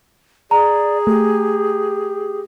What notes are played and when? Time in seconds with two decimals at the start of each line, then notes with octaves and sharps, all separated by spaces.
0.51 G#4 D5 A#5
1.07 A3 G4